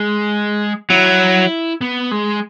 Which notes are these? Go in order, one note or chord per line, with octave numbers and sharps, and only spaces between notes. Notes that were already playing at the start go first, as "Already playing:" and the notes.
Already playing: G#3
F#3 E4
B3
G#3